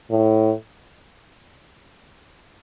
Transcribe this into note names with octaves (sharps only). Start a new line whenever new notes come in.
A2